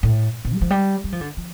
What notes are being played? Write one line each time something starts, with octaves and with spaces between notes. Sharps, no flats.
A2
B2
G3
F3
G3
G3
F3
D3
F3